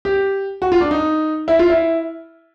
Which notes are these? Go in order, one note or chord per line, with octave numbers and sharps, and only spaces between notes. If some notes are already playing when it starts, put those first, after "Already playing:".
G4
F#4
F4
D4
D#4
E4
F4
E4